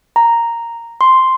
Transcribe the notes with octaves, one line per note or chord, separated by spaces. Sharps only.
A#5
C6